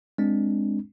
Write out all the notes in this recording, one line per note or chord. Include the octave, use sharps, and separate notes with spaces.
G#3 C4 D4